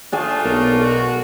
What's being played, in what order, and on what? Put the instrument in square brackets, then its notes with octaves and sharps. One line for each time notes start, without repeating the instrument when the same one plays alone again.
[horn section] A3 D4 F4 [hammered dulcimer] G#4 G#5
[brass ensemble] B1 [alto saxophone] A#4
[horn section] F#4